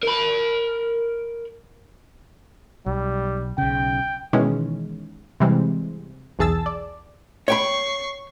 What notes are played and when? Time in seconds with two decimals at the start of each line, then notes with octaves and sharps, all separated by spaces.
0.03 A#4 B5
2.86 B1 G3
3.58 B1 C#3 G5
4.33 B2 D#3 E3 G#3 C#4
5.40 C3 E3 G3 G#3 C4
6.39 B1 E2 G#4 A5 E6 A6
6.66 D5
7.48 C#5 G5 B5 C#6 C7